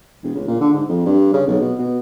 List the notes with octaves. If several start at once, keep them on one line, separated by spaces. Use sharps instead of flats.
E1
C#2
A#2
D3
G#2
F2
G2
C#3
B1
B2
B2